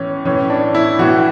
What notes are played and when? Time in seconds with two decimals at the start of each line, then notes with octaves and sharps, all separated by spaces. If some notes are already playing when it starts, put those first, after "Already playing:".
Already playing: A2 E3 C#4
0.25 A2 E3 C#4
0.50 D4
0.75 E4
0.99 A2 E3 F#4